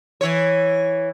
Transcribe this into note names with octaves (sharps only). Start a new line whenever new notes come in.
E3 C#5